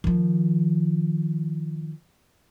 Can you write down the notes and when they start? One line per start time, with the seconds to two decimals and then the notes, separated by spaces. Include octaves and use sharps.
0.04 D#3 F3